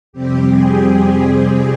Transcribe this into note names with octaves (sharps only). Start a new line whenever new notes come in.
F2 C3 G3 C4 G4
G#4
G4
G4